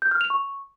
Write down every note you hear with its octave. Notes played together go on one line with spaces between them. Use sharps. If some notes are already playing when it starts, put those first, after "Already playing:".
G6
F6
F7
C#6